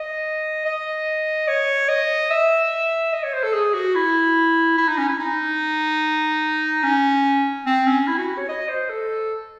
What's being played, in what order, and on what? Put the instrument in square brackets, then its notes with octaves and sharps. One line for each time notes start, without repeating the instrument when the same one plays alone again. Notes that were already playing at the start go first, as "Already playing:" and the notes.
Already playing: [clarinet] D#5
D#5
C#5
D#5
E5
D#5
C#5
C5
A4
G#4
F#4
E4
E4
D#4
C#4
E4
D#4
C#4
C4
C#4
E4
F#4
F#4
C#5
D#5
C5
A4